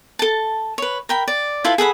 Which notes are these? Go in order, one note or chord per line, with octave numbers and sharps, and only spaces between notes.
A4 A5
B4 C#5
A#4 G5 B5
D5
E4 F4 A4 B4
G#4 A4 F#5 B5